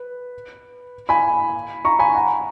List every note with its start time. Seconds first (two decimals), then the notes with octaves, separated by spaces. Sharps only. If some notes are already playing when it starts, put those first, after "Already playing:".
Already playing: B4
1.09 G#5 B5
1.85 A#5 C#6
1.99 G#5 B5
2.15 F#5 A#5